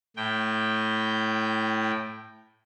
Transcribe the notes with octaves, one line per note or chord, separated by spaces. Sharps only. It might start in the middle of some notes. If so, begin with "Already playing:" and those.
A2 G5